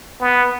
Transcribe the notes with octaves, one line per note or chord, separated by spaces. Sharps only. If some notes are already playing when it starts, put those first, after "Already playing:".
B3